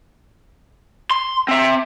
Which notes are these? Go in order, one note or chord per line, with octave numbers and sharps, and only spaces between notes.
C6
C4 E5